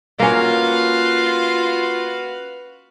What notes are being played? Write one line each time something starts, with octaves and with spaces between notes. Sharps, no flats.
A#3 C#4 F4 F#4 B4 F5